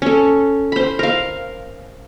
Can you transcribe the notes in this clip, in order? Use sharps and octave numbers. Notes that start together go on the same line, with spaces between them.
C#4 A4
C5 B5
A#4 F5